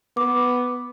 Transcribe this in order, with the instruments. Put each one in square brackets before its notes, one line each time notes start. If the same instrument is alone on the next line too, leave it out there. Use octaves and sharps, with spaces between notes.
[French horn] B3 [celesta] D6